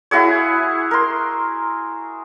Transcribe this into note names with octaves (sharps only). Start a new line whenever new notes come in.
E4 F#4 G#4 C#5
A#4 C6